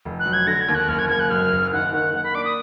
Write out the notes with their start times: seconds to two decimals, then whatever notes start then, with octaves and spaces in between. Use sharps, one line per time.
0.05 F1
0.20 F#6
0.25 F#3
0.33 G#6
0.46 D3 A#6
0.61 G#6
0.68 D#2
0.75 F#6
0.88 F#1 F6
0.99 G#6
1.09 F#1 G#6
1.20 F#6
1.30 F#2 F6
1.52 F#1
1.73 D#3 F#5
1.93 D#3 F#5
2.13 A#3 F#5
2.24 B5
2.35 D4 D6
2.45 D#6